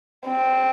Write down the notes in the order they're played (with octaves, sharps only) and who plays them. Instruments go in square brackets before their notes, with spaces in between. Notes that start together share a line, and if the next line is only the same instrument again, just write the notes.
[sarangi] C4